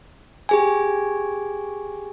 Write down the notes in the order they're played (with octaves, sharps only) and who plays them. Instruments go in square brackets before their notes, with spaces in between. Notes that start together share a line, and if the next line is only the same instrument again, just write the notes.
[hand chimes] G4 G#4 G#5